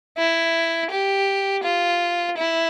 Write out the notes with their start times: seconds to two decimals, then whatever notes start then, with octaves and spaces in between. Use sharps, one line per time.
0.18 E4
0.91 G4
1.64 F4
2.37 E4